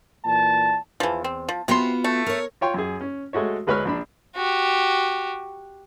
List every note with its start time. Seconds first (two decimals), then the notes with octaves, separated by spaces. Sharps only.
0.25 A#2 E3 D5 A5
1.00 E2 E3 F3
1.24 C4
1.49 F3
1.68 C3 B3 F4 F#4 C6
2.04 A3
2.26 A#4 C#5
2.61 F4 C#5 G5 C6
2.74 F#2 G#4
3.01 C#4
3.33 G#3 A3 F#4 C#5
3.67 D2 G#3 B4 C#5 B5 F6
3.85 A#1 D4 B5
4.36 F#4 G4